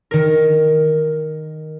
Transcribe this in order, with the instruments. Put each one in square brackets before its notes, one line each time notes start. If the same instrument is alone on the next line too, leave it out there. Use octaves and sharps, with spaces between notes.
[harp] D#3 A#4